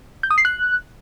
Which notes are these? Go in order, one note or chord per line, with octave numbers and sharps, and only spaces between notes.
G6
D#6
C7
F#6